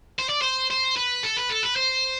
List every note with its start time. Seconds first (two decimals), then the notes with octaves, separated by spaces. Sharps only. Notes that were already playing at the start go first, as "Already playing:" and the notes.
0.19 C5
0.29 D5
0.42 C5
0.71 C5
0.97 B4
1.23 A4
1.37 B4
1.50 A4
1.63 B4
1.76 C5